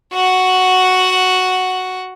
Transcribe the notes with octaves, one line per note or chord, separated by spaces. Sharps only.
F#4 F#5